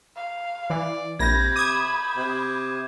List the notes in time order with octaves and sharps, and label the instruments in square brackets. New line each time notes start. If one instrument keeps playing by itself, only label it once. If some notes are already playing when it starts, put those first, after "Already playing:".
[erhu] F5
[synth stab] E3 [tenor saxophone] D5
[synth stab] A#1 A#6 [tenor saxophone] C3 [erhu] B5 [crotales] G6 G#6
[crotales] D6 [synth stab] D#6 G#6
[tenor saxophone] C3